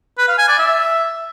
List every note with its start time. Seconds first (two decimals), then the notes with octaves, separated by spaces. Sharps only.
0.18 B4
0.28 F5
0.38 G#5
0.48 D5
0.59 E5